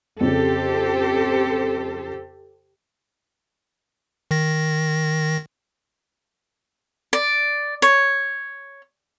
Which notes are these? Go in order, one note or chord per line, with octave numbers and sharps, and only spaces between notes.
F2 C#3 G4 A4 C5
D#3 A#6
D5
C#5